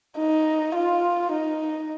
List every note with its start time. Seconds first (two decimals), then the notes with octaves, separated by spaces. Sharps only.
0.18 D#4
0.75 F4
1.32 D#4